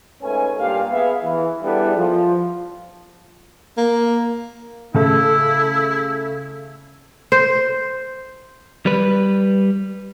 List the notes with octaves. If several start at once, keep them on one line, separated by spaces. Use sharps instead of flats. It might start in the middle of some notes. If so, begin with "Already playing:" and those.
G#2 A3 C#4 B4 G#5
G2 A#2 A#3 G4 F5
B3 G#4 B4 E5 F5
E3
G3 B3 D4 E4 G#4 A4
F3
A#3
C#3 A3 E4 A4
C5
G3 B4